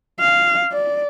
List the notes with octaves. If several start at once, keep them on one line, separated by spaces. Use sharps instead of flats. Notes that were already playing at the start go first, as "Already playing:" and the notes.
F5
D5